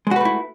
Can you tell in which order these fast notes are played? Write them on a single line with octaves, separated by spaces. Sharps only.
G#3 F#4 B4 A3 E4